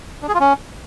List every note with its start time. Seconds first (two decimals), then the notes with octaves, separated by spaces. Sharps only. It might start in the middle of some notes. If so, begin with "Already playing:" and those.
0.22 D4
0.28 G#4
0.34 F4
0.40 C#4